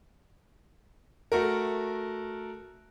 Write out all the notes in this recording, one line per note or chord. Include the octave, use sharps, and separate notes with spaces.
A3 F#4 A#4